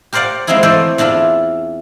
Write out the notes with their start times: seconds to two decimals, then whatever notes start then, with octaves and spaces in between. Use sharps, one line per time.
0.13 G4 A#4 C5 D5 F5 F#5
0.47 G#3 A#3 C4 D#4 E4 G#4
0.63 E3 A3 A4 C5 D5 E5
0.98 E2 E3 D4 E4 F4